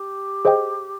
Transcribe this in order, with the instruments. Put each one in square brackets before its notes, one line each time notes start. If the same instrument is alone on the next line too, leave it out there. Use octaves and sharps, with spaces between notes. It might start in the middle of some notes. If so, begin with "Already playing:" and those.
Already playing: [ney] G4
[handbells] G#4 C5 D#5 G5